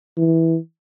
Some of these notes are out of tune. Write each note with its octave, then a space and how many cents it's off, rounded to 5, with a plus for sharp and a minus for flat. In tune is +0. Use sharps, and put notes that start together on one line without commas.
E3 -10